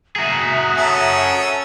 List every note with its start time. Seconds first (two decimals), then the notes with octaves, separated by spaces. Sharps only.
0.16 F#4 G#4 E5 A#5 D#6
0.77 C#4 A4